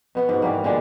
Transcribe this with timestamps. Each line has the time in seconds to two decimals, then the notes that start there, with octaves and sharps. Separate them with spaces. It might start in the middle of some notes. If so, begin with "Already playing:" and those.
0.15 B2 B3 F#5
0.29 G#2 F#4
0.42 E3 G3 A#3
0.64 A#2 D3 G#3 D4